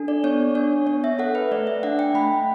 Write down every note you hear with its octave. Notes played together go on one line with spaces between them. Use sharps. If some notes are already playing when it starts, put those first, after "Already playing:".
Already playing: D4 A4
D5
B3 C#5
D4 C#5
B3 C#5
E5
A4 F#5
B4
A3 D5
E5
D4 F#5
G5
A3 B5